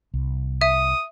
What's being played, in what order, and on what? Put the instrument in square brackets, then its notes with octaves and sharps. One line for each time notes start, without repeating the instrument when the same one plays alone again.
[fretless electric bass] C2
[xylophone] E5 [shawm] D#6